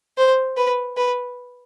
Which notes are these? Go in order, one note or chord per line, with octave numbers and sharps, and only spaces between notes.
C5
B4
B4